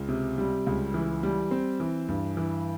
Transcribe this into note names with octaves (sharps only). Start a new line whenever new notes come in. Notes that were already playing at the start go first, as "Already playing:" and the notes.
Already playing: C#2
C3
G3
C#2
E3
G3
C4
E3
G2
E3